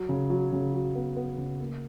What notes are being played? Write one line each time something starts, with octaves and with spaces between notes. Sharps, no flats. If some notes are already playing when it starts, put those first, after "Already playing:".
Already playing: F#3
C#3
F#3
C#3
F#3
B3
B3
C#3
A#3